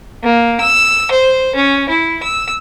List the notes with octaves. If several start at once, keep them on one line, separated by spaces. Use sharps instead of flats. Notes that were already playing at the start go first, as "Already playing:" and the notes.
A#3
E6
C5
C#4
E4
E6